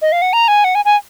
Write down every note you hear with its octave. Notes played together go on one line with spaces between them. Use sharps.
D#5
F5
F#5
A#5
G#5
F#5
G#5
G#5